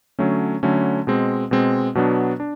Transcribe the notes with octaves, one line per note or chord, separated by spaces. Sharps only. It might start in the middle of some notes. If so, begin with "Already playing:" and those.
D3 F#3 A3 C#4
D3 F#3 A3 C#4
B2 G#3 C4
B2 G#3 C4
B2 F#3 B3 D4
D4